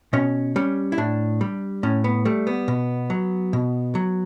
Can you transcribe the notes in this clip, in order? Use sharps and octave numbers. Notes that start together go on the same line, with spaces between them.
B2 C#4
G3 C#4
E4
A2 D4
G3
A2 C#4
B3
G3 A3
B3
B2
F#3
B2
F#3